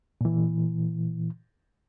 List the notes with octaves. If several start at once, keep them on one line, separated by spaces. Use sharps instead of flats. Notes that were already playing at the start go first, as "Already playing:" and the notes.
A#2 E3